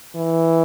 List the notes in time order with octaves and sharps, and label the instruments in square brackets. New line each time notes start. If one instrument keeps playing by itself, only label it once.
[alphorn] E3